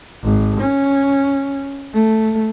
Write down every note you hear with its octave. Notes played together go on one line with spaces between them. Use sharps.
G#1
C#4
A3